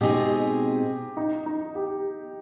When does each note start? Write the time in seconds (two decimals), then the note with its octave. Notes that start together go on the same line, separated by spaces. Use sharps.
0.01 B2 G#3 C4 D#4 G4 G#4
1.17 D#4
1.46 D#4
1.75 G4